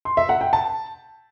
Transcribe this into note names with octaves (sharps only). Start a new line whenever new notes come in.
C6
E5
F#5
G5
A5